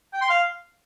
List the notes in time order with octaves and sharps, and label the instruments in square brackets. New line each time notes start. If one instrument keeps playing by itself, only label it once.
[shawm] G5
C6
F5